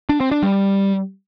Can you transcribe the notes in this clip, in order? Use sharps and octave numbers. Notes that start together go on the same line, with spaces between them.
D4
C4
D4
G3